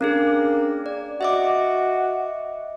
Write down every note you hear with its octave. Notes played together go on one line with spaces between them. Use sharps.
A#3 C#4 D4 G#4
D5
F#4 D#5 E5 D6